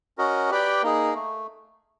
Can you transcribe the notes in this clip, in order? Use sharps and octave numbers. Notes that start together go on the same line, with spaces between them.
C#4 F#4 A#4 D#5
G4 B4 D5 G5
A#3 D#4 G#4
A3